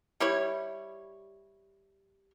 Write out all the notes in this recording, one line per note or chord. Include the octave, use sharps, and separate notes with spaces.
G3 E4 C#5